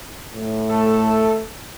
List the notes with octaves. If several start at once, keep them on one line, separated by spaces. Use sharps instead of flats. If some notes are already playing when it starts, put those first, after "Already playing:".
A2
A3 A4